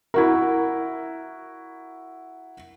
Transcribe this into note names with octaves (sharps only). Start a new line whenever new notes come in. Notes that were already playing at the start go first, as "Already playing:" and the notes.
E4 F#4 A#4